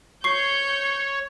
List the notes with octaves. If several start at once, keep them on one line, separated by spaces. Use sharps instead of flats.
C#5 C#6 G6 C7 C#7